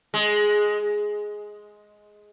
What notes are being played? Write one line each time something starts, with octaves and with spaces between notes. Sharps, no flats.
G#3